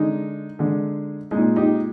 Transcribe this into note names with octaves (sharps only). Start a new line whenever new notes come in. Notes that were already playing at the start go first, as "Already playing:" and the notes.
Already playing: D3 G#3 D#4
D3 G#3
A#2 G#3 D#4
D#4 G4